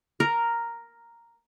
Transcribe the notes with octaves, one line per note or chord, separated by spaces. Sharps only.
A#4